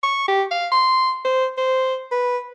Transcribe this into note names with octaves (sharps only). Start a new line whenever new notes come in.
C#6
G4
F5
C6
C5
C5
B4